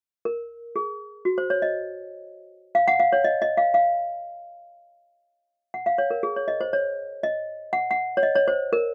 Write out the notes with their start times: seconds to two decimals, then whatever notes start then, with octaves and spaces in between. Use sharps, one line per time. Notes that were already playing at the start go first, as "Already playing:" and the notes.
0.25 A#4
0.76 G#4
1.25 F#4
1.38 C5
1.50 C#5
1.62 D#5
2.75 F5
2.88 F#5
3.00 F5
3.13 C#5
3.24 D#5
3.42 D#5
3.57 F5
3.74 F5
5.74 F#5
5.86 F5
5.98 C#5
6.11 A#4
6.23 G#4
6.36 C#5
6.48 D#5
6.61 C5
6.73 C#5
7.23 D#5
7.73 F#5
7.91 F#5
8.17 C#5
8.23 D#5
8.36 C#5
8.48 C5
8.73 A#4